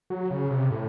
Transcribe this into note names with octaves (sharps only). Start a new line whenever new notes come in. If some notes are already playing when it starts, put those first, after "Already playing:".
F#3
C#3
C3
A2